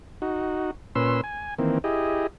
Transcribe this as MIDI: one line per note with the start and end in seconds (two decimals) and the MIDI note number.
0.22 0.71 63
0.22 0.71 66
0.95 1.21 46
0.95 1.21 61
0.95 1.21 71
0.95 1.21 84
0.95 1.21 88
1.24 1.54 80
1.58 1.78 51
1.58 1.78 52
1.58 1.78 58
1.58 1.78 60
1.84 2.27 64
1.84 2.27 67
1.84 2.27 68
1.84 2.27 75